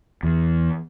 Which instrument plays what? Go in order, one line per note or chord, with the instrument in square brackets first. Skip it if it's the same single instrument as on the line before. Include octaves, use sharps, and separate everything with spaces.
[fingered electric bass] E2